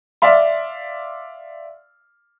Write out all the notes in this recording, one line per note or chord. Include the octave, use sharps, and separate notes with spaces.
D5 E5 F5 C6